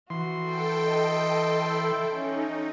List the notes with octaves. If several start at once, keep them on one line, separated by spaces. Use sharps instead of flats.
E3 F#4 C6
A4 G5
D#5
E4
C#4 D#4